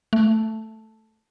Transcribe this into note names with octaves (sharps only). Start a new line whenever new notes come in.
A3